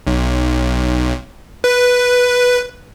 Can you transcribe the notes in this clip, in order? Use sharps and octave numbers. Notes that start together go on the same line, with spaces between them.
B1
B4